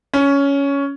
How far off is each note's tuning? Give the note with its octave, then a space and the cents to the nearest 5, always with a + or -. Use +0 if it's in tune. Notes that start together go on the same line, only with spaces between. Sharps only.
C#4 +10